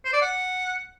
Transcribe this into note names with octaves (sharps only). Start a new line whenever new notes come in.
C5
D5
F#5